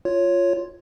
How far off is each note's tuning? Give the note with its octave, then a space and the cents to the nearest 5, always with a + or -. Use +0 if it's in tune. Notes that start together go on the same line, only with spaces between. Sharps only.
F4 +0 C#5 +0